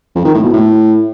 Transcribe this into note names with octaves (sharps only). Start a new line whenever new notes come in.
F2
D#3
A2
B2
A2